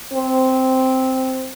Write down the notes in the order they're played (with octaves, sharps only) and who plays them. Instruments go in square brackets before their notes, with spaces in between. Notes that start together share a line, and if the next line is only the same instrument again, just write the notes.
[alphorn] C4